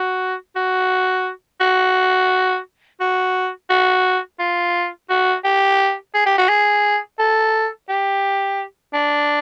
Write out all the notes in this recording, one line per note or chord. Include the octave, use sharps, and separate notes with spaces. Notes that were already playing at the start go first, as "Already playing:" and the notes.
Already playing: F#4
F#4
F#4
F#4
F#4
F4
F#4
G4
G#4
G4
F#4
G#4
A4
G4
D4